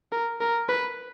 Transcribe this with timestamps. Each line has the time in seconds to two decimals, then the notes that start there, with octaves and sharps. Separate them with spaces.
0.12 A#4
0.41 A#4
0.69 B4